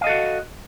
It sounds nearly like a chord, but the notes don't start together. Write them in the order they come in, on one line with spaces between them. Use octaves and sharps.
F5 D#5 A4 F#4